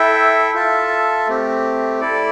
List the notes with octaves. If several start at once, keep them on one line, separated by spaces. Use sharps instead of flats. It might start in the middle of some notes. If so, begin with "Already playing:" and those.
Already playing: E4 A4 E5 G5
F4 A4 E5 A5
A3 C4 G4
E4 A4 D5